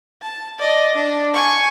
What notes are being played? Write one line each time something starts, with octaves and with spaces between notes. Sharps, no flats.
A5
D5 D#5
D4
G#5 C#6